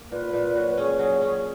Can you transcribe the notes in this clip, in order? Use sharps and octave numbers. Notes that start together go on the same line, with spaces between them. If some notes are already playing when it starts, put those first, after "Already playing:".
Already playing: A#3
A#2 B4
A#2
F#3
C#4 G#4
F#3
C#4